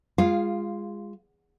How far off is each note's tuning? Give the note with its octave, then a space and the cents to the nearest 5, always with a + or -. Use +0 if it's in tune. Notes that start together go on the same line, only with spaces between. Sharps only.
G#3 -20 F4 -10 F5 +5